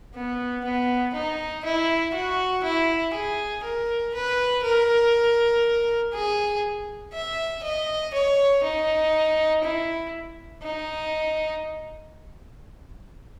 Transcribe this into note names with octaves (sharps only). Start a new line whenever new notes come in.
B3
B3
D#4
E4
F#4
E4
G#4
A#4
B4
A#4
G#4
E5
D#5
C#5
D#4
E4
D#4